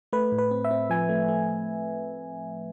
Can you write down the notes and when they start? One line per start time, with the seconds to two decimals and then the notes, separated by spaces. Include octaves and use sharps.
0.13 A3 B4
0.32 A2
0.38 B4
0.51 C4
0.64 E5
0.71 C4
0.90 F3 G#5
1.09 A3
1.28 A3